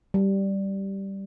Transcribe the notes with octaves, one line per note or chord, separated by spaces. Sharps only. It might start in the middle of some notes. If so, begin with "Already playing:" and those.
G3